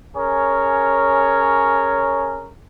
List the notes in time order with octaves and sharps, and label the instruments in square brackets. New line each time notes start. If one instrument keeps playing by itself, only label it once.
[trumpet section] C#4 G#4 A#4 C#5